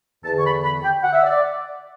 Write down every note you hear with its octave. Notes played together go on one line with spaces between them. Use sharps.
E2 D3 A5
C#6
B5
B5
G5
F#5
E5
D5